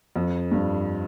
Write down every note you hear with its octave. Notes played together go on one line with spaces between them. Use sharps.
F2
G2